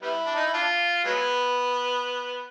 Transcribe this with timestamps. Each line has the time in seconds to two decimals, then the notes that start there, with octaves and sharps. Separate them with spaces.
0.02 G3 B3 E4
0.26 D4
0.36 D#4
0.45 E4
0.53 D4 F4
1.05 F#3 G#3 B3